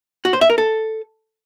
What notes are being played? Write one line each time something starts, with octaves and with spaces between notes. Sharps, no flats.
F#4
C5
E5
A#4
A4